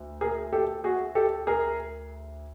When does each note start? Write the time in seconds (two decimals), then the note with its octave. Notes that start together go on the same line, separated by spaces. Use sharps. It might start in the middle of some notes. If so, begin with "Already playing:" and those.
Already playing: D2
0.21 G#4 A#4
0.53 G4 A4
0.84 F#4 G#4
1.15 G4 A4
1.47 G#4 A#4